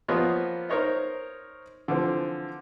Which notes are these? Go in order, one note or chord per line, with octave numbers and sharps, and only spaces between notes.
F3 A#3 B3 B4 C#5 D#5
D#4 A#4 C5 C#5 D#5
D3 E3 F3 C4